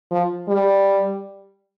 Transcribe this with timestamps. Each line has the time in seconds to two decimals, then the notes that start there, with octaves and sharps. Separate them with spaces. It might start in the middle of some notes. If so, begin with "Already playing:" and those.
0.11 F3
0.48 G3